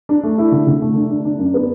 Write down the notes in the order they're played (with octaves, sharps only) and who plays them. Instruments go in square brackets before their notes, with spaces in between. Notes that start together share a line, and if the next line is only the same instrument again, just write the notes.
[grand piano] D4
A3
E4
D3
D3
A3
D4
D4
D4
F#2
B3